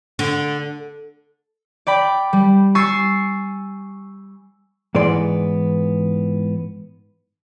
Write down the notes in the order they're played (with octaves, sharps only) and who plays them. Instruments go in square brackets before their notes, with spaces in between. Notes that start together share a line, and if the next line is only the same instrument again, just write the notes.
[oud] D3
[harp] D5 G5 B5
G3
G#5 C#6 E6 A6 C7
[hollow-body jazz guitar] G#2 E3 B3 D5 C6